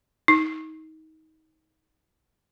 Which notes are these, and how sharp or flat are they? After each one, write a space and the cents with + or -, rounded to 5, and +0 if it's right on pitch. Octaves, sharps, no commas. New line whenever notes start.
D#4 +25